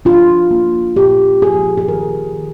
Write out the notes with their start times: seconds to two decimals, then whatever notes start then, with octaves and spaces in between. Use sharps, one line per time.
0.05 D4 F4
0.51 A#3
0.96 A#2 G4
1.42 F3 G#4
1.78 G#4
1.88 D#3 A#4
2.33 D#3